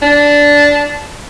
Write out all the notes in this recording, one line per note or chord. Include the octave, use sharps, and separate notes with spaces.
D4